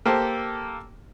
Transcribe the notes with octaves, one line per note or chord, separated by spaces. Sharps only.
A#3 G4 A4 C5